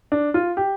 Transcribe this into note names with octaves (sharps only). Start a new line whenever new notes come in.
D4
F4
G4